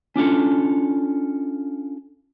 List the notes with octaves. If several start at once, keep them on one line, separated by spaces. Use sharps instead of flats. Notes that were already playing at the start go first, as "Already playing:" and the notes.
C#4 D4 F4 A4